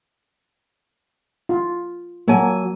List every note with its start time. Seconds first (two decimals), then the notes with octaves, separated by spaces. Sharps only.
1.49 F4
2.28 F#3 A#3 G#5